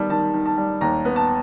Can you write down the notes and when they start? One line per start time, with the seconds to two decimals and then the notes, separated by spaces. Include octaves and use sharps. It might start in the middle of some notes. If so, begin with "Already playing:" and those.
Already playing: D#3 G3 B3 A5
0.10 D#3 A5
0.34 D#3
0.46 A5
0.57 G3
0.81 D#2 A#5
1.05 B3
1.16 A5